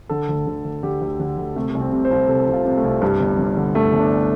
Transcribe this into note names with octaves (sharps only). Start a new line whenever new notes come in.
D3 A4
D2
D3
D2
D3 G4
D2
D3
D2
C3 A3
A3
C2
C4
C3
C5
C2
C3 A4
C2
F4
C3
A3
C2
G2 G3
G1
G1
D3
G2 A3
G1
D4